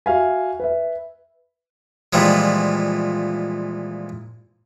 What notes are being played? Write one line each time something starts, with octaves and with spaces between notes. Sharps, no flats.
F#4 E5 F5 G#5
B4 E5
A#2 E3 F3 G3 G#3